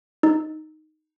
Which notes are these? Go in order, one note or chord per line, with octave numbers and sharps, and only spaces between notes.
D#4